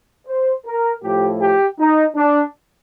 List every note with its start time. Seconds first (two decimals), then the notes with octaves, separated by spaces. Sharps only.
0.27 C5
0.66 A#4
1.03 A2 F3 A3 G4
1.41 G4
1.79 D#4
2.16 D4